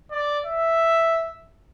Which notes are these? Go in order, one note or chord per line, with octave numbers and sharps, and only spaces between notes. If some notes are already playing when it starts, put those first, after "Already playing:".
D5
E5